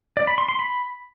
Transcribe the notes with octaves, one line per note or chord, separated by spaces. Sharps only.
D5
B5
C6
C6
B5